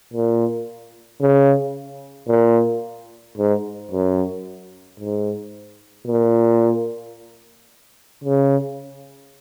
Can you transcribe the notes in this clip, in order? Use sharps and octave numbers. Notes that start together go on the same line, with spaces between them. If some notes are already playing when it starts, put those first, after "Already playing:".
A#2
C#3
A#2
G#2
F#2
G#2
A#2
C#3